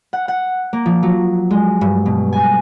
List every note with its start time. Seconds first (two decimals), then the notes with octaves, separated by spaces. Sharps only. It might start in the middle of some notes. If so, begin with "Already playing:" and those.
0.13 F#5
0.28 F#5
0.73 A#3
0.86 F3
1.03 F#3
1.51 G#3
1.81 G2
2.06 B2
2.33 G#5